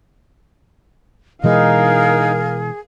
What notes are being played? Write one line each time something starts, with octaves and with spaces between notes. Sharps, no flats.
B2 E3 G#3 D#4 G#4 A#4 F5